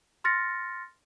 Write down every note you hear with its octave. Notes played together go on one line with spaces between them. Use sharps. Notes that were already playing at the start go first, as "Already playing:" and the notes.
C6 F6 A6 A#6 C#7